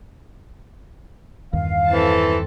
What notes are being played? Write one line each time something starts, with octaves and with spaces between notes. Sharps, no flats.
E2 G2 D#3 F5
E3 C4 A4 A5